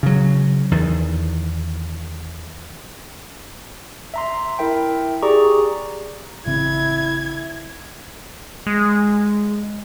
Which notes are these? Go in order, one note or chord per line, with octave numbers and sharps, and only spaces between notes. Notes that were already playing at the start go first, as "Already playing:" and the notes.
C#3 F#3
E2 D#3
E5 A#5 C6
E4 A#4 E5 G5
G4 G#4 D5 A#5 C#6
A1 C#3 C4 E4 G#6
G#3